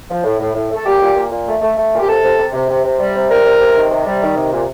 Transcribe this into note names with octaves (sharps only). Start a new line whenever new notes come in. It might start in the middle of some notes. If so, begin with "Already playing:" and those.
F3
A2
A2
A2
A3
A4
A#2 G4
A#2
A#2
A#2
A3
A3
A3
A#2
G4
C3 A4
C3
C3
C3
C3
C3
G3
C3
G3 A#4
C3
C3
D#3
C3
G3
D#3
C3
A#2